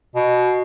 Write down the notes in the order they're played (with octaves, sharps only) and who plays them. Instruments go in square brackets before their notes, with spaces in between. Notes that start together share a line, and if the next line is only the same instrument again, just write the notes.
[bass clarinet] B2